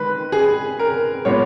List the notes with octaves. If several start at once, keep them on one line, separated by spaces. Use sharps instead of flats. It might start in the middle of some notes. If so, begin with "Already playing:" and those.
Already playing: D#3 G#3 B4
G#4
A#4
A#2 G#3 B3 C#5